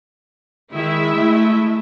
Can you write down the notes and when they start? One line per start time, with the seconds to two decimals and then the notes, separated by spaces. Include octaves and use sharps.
0.73 D#3 G#3 E4 E5
1.16 A3